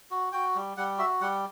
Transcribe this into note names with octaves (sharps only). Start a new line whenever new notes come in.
F#4
F#4 G5
G3
G3 F#5
F#4 E5
G3 F#5